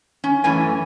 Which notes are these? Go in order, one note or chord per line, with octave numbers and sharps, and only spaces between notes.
C#4
F#2 E3 A3 C#4 G#5